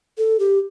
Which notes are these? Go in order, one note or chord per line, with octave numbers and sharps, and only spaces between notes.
A4
G4